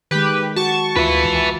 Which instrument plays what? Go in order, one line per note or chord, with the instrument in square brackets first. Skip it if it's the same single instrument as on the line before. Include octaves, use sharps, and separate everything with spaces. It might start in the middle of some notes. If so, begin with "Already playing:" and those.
[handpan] D#3 G#3 [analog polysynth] G4 B4
[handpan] F#4 [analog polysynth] A5 C#6
[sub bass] D2 [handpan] F4 [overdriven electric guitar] B4 E5
[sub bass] C#2